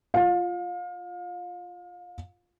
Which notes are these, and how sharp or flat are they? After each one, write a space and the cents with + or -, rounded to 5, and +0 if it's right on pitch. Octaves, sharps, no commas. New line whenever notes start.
F4 +0 F5 +30